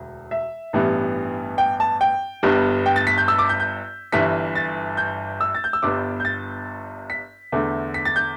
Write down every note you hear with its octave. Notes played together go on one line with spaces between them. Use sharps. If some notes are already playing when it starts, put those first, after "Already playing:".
Already playing: E1 D2
E5
A1 G2 E3 G3 B3
G5
A5
G5
G1 G2 G3 B3
G5
A6
B6
G6
E6
D6
G6
G6
G1 G2 E3 B6
A6
G6
E6
A6
G6
E6
G1 G2 G3 B3 D6
G6
A6
B6
E2 D3 A3
B6
A6
G6